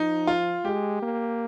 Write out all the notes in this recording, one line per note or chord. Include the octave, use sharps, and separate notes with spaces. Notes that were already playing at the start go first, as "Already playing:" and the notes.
Already playing: F3 D#4
F4
G#3 G4
A#3